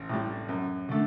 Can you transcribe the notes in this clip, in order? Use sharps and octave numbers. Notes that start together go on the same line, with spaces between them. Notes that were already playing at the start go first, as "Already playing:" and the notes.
Already playing: A1
A2 G3
F#2
D3 A3